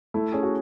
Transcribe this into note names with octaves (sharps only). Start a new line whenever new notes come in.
A3 E4
C#4 G#4
F#4